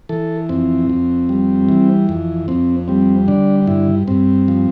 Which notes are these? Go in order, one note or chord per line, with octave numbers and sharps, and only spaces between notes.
E3 A4
F2 C4
F2
G3
E3
F2
F2 C4
G3 C4
D3 D4
G2 E4
G2 C4
F3